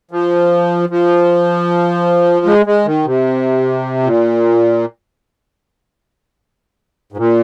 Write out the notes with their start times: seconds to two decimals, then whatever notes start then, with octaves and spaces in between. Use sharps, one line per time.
0.11 F3
0.89 F3
2.46 G#3
2.66 G#3
2.85 D#3
3.05 C3
4.03 A#2
7.12 G#2
7.17 A#2